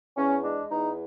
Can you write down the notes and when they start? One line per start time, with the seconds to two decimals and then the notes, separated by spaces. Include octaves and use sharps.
0.17 E2 C#4
0.44 G#3 D4
0.71 E2 D#4